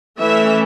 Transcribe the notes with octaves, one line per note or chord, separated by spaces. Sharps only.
E3 A3 C#4 E5